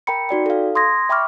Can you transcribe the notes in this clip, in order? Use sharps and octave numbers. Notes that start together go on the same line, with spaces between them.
A#4 G5 A#5 B5 C#7
D#4 F#4 D5 G5
A4 F5
C6 D#6 G#6 A#6
E5 G5 B5 C#6 D6 F6